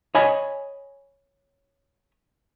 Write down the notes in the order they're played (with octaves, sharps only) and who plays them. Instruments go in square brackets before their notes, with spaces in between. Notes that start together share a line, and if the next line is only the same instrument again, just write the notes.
[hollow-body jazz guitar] C#5 D#5 G#5 B5